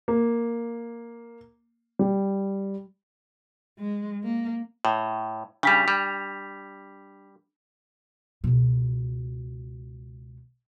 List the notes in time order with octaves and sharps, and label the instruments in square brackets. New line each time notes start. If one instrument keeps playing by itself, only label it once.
[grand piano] A#3
G3
[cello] G#3
A#3
[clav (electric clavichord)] A2
[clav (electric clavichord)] C#3 G3 [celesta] D4 B6 F7
[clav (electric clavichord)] G3
[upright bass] C#2 B2